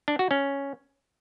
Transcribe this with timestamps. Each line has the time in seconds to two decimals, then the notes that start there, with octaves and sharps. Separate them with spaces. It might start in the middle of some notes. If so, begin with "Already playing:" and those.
0.08 D4
0.19 F#4
0.31 C#4